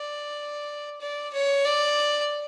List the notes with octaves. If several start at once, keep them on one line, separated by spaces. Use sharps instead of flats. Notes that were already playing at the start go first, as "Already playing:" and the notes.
Already playing: D5
D5
C#5
D5